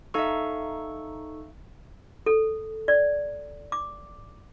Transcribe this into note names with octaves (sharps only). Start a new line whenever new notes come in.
D#4 A4 E5 F5 C#6
A4
D5
D6